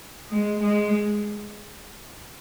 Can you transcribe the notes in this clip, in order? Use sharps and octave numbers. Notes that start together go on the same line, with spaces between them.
G#3
G#3